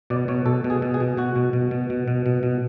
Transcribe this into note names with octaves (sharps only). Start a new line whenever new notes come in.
B2 D5
B2 C#5
B2 A4
B2
G#4
B2
G#4
B2
B2 F#4
B2
B2
B2
B2
B2
B2
B2